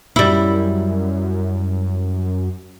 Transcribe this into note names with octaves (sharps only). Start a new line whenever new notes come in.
F#2 G3 E4